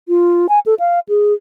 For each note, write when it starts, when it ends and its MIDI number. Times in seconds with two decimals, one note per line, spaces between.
0.08 0.47 65
0.49 0.59 80
0.66 0.74 69
0.80 1.00 77
1.09 1.33 68